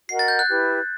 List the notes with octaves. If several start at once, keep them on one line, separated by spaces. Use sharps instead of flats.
F#4 A#4 D#5 F#5 C7
A6
G6
F#6
E4 G4 B4